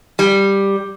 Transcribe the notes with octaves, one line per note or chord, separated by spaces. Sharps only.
G3